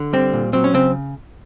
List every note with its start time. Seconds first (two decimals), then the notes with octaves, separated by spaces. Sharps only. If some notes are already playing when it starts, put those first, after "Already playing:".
Already playing: D3
0.13 G3 C4
0.33 A#2
0.53 F#3 C4
0.64 C#4
0.73 C#3 C4